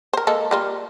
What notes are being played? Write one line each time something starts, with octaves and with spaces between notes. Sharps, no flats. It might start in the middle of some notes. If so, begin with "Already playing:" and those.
A#4 C5
G#3 A#3 A4
G3 A#3 F4